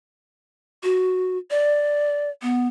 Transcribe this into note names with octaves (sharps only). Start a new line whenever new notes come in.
F#4
D5
B3